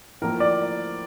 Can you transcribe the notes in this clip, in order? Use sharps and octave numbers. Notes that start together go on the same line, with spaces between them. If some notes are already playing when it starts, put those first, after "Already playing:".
A2 F3 A#3 A#4
D5